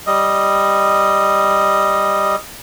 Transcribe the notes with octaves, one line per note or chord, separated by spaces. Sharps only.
G3 D#5